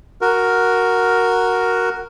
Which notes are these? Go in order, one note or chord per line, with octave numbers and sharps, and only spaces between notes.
F#4 A#4